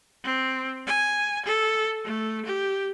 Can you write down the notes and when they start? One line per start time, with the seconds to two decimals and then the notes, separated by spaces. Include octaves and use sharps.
0.24 C4
0.87 G#5
1.45 A4
2.05 A3
2.45 G4